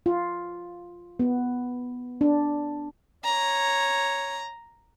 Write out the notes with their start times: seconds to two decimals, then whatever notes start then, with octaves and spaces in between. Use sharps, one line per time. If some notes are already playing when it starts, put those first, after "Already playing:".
0.06 F4
1.19 B3
2.21 D4
3.25 C#5 A#5